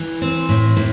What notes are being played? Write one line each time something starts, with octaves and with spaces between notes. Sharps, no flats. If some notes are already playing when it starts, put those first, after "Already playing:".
Already playing: E3
C4
A2
A2